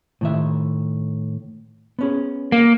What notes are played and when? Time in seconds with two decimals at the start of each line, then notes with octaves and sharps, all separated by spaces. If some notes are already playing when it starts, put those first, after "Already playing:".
0.21 A2 D#3 E5
1.99 B3 C#4 G#4
2.52 A#3